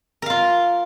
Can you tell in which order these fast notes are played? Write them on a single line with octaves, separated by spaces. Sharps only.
A#4 F5 F4